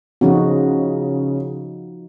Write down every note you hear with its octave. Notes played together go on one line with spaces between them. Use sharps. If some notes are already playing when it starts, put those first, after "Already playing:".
C#3 F3 D#4 F#4